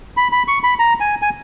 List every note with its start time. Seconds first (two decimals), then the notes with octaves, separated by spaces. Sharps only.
0.17 B5
0.32 B5
0.48 C#6
0.63 B5
0.79 A#5
1.00 G#5
1.22 G#5